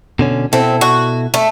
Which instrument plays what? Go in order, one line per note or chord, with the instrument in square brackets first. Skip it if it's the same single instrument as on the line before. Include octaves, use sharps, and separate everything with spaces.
[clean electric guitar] B2 D3 C#4
[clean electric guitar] B2 E4 A4 [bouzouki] C4
[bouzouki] F#4
A3